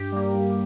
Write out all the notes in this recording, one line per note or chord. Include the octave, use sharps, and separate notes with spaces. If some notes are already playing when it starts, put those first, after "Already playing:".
Already playing: G2 G4
G3 A#3
G2